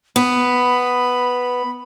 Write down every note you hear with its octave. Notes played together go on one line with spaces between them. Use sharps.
B3 B5